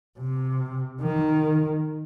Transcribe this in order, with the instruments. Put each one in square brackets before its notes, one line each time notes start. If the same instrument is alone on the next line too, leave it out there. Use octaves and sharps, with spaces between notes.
[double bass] C3
D#3